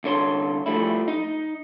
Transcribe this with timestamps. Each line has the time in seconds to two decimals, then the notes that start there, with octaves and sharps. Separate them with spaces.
0.04 C2 D3 C#5 C6
0.66 F3 G3 A3 E4
1.08 D#4